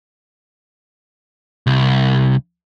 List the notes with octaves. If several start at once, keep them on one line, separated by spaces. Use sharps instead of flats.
C2